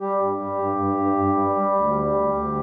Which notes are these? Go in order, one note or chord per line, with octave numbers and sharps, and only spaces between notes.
G3 G4
G2
G3
G2
G2
G2
G2
G3
G3
D2
G3
D2
D2